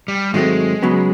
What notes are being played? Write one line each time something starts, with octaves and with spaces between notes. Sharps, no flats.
G3
G#2 D#3 F#3 G#3 A3 C4
C#3 F#3 B3